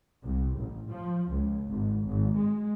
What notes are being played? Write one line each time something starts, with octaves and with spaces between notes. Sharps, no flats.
C2
A1
F3
C#2
G#1
G#1
G#3